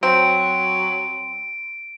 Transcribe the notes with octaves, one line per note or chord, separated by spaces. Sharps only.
F#3 C4 D7